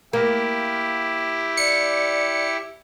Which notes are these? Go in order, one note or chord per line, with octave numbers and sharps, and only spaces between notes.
A#3 E4 G4 F5
D5 C#7